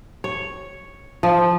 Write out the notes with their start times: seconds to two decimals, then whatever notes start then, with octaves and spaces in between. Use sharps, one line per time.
0.24 C#5
1.23 F3